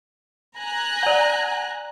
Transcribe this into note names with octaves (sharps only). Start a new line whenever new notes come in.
G#5 A#5 F#6
D5 F#5